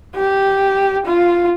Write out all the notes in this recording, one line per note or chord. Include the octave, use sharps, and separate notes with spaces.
G4
F4